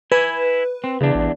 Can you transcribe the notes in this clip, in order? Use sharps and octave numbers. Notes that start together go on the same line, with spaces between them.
E4 B4 G#5
C4
E2 C#3 D4
A1